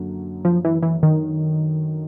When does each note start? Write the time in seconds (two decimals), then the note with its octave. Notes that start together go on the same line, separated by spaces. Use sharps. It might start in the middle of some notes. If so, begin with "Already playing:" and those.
Already playing: F#2 D3 F#3 A#3
0.45 F3
0.65 E3
0.83 E3
1.03 D#3